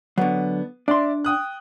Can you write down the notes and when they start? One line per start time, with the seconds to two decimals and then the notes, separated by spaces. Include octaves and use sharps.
0.18 D3 F#3 B3
0.88 D4 D5 E5 C6
1.25 G5 D#6 F#6